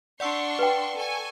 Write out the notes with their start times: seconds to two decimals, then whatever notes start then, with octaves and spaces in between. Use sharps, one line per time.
0.20 D4 D5 F#5 C6 C#6 E6
0.59 B4 G5
0.95 A4 G#5 C#6